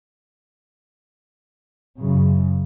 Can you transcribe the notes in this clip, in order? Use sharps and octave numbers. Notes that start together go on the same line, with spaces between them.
F#2 C#3